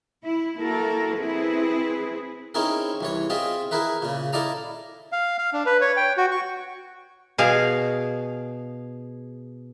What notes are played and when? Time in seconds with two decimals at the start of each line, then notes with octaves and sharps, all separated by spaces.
0.23 E4
0.57 A#3 E4 F#4 A4 A#4
1.18 C4 E4 G#4 B4
2.55 C4 C#4 D#4 E4 G#4 A#4
3.01 C2 E3 C#5
3.30 C4 F4 G#4 D#5 E5
3.71 E4 G#4 A#4 B4 E5
4.02 A#2 C#3
4.33 E4 A4 D5 D#5 F5 A#5
5.12 F5
5.38 F5
5.53 D4
5.66 B4
5.81 C#5
5.97 G5
6.17 F#4
6.31 C#6
7.38 B2 G#4 F5